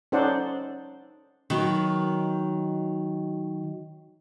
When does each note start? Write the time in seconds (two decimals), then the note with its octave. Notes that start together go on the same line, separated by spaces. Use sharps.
0.12 C#4 D#4 A4 C5 D5 F#5
1.50 D#3 F#3 B3 F#4